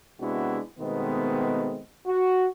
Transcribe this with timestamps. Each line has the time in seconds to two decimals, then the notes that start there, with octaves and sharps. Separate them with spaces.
0.21 C3 G#3 B3 D4 E4 F#4
0.80 B2 D#3 G#3 A3 B3 C4
2.07 F#4